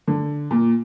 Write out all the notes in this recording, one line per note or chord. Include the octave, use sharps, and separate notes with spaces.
D3
A#2